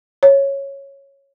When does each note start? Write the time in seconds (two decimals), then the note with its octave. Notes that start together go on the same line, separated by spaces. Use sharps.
0.23 C#5